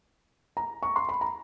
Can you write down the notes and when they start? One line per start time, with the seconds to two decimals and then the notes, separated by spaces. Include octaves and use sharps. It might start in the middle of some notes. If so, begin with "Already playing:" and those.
0.57 A#5
0.83 C#6
0.96 C6
1.09 B5
1.21 A#5